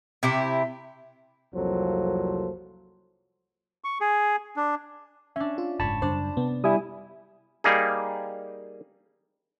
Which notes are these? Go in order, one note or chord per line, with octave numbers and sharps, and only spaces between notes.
C3 E4 G4
C2 F2 F#3 A#3 A4 C5
C#6
G#4
D4
C#4 D4 E5
F4
F#1 G#2 C#5 A5 B5
F#2 C#3 G3 D4 C5
C3 B3
G3 E4 E5 G#5 D#6
G3 A#3 D#4 G#4